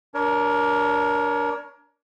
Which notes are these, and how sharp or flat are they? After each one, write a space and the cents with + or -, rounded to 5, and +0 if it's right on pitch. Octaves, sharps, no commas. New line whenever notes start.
D4 -15 A#4 +15 C#5 +15